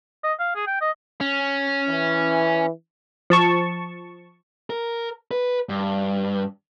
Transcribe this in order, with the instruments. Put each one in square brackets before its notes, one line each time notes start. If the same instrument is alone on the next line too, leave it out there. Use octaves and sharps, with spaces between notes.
[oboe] D#5
F5
G#4
G5
D#5
[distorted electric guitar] C#4
[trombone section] E3
[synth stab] F3 A5 C#6
[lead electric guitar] A#4
B4
G2